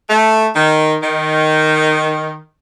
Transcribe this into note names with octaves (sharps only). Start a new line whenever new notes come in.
A3
D#3
D#3